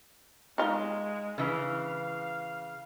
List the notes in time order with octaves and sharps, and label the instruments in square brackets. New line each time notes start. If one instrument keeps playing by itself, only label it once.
[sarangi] G#3 [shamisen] D#4 F4
[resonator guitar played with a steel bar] C#3 E3 [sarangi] F5